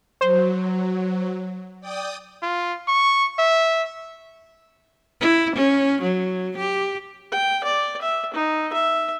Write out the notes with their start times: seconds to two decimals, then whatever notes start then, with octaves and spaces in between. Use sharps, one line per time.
0.21 F#3 C5
1.80 D5 G5 D#6
2.43 F4
2.88 C#6
3.39 E5
5.21 E4
5.56 C#4
6.02 F#3
6.57 G4
7.32 G5
7.64 D5
8.02 E5
8.34 D#4
8.73 E5